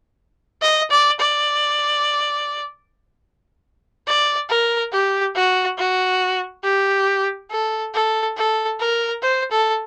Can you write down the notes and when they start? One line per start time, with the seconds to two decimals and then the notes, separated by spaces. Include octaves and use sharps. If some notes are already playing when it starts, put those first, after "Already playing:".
0.62 D#5
0.90 D5
1.19 D5
4.07 D5
4.49 A#4
4.92 G4
5.35 F#4
5.78 F#4
6.64 G4
7.51 A4
7.94 A4
8.37 A4
8.80 A#4
9.22 C5
9.51 A4